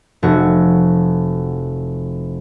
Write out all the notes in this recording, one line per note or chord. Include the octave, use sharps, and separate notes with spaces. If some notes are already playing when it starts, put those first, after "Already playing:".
F1 F#4